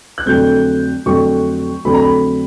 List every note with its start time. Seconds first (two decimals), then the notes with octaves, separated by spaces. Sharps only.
0.18 F#6
0.26 F2 D3 F#3 A3 C4 G6
1.06 F2 D3 F#3 A3 C4 C#6
1.85 F2 D3 F#3 A3 C4 B5
1.94 A#5
2.02 B5